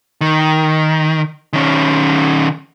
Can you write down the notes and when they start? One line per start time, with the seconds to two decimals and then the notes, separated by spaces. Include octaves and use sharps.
0.21 D#3
1.53 D#3 C#4